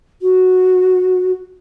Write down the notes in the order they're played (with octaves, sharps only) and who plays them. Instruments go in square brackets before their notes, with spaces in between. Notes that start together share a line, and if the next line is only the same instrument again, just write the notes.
[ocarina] F#4